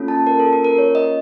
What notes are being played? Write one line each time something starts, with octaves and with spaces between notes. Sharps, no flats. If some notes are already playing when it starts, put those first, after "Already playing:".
Already playing: A#3 C#4 F4 A4
A5
A#4
A4
A#4
A#4
C#5
D#5